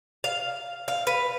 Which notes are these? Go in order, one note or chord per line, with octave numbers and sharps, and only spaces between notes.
F5
F5
B4